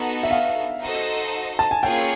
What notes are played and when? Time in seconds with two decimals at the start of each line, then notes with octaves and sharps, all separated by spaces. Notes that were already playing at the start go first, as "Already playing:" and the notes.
Already playing: B3 D#4 F#4 A4
0.23 E5
0.31 F5
0.81 D#4 F#4 A4 C5 D#5
1.59 A5
1.71 G#5
1.83 A#3 C#4 F4 G#4 C#5 G5